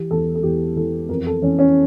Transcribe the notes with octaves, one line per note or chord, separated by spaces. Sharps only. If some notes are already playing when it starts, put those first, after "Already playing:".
Already playing: E3 G4
E2 A4
A4
E2 G4
E3 A4
F2 A#4
A4
E3 C#4
C#4